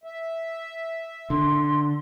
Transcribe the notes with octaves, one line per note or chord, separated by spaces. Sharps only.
E5
D3 C6